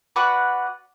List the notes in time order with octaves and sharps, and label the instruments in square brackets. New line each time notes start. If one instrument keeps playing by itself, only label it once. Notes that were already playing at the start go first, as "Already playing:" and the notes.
[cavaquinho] F#4 B4 D5 F#5